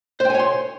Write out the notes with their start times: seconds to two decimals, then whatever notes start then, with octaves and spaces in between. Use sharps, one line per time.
0.20 C5
0.25 G5
0.30 G#5
0.35 C#5
0.39 C6